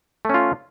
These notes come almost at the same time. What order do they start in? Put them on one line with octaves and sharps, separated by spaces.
A3 C#4 F4